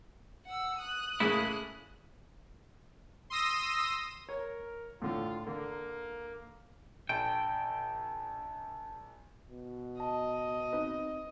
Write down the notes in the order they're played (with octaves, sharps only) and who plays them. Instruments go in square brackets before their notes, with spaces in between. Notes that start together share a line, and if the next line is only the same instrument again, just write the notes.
[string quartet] F#5 E6
D#6 F#6
[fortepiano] A2 C#3 G#3 [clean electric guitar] A#3 E4
[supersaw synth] C6 D#6 E6 A#6 D#7
[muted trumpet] A#4 [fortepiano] C#5
[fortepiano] A2 D3 [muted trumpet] F4
[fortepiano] D3 [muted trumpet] A#3
[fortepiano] A#1 [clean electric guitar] G5 [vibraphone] A5
[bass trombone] B2
[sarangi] D#5 [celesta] A5
[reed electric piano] C4 D#4 B4